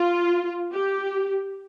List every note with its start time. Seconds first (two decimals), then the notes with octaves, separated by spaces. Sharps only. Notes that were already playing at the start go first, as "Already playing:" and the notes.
Already playing: F4
0.73 G4